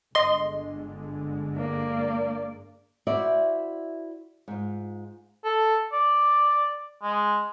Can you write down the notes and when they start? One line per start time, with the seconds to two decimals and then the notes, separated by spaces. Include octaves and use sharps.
0.15 G1 D3 G#3 D#5 C6
1.57 A#3 D5
3.07 E4 F#4 C5 D5 E5
4.48 G#2 F4
5.44 A4
5.93 D5
7.03 G#3